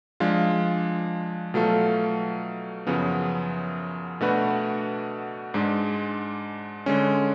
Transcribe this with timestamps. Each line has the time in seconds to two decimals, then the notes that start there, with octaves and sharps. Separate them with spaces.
0.20 F3 G#3 D4 F4
1.54 B2 F#3 A3 F4 A4
2.87 F#2 C#3 F3 B3
4.21 B2 A3 D4 F#4 B4
5.54 G#2 G#3 D4
6.86 D3 G#3 C#4